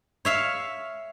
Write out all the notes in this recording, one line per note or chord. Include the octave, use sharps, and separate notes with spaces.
C#5 E5 F5